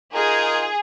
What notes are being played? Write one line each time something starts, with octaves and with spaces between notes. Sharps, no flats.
D#4 F4 G#4 A#4